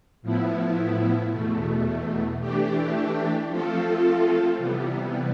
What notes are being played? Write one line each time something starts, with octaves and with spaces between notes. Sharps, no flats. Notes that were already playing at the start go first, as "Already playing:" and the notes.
A2 F3 B3 E4
E2 B2 A3
E3 A3 D4 G4
F3 A3 C4 F4 A4
C3 E3 G3 B3